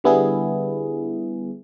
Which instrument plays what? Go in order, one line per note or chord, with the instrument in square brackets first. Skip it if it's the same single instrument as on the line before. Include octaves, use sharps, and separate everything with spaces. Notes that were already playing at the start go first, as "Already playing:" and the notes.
[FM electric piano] D3 G3 B3 E4 G#4